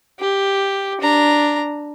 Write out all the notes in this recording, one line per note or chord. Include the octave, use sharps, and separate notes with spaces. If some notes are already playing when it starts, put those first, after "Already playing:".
G4
D4 A#5